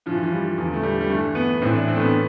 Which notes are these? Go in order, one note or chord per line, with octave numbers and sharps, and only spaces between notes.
G2 F3
E3
F3
G3
E2 D3 F3
A3
G3
G3
G2 E3 A3
B3
A2 E3 C4
D4
C4
A3
B3